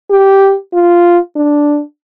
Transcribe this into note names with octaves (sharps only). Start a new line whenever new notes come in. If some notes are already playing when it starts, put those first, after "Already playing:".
G4
F4
D4